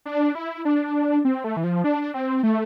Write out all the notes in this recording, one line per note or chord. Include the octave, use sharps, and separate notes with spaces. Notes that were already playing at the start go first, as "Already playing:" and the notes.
D4
E4
D4
C4
A3
E3
F3
D4
C4
A3